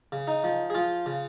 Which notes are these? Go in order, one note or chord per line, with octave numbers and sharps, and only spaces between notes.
C#3
D#4
F3
G#4
F3 F4
C#3